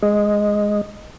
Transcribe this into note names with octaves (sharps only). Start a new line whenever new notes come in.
G#3 D#5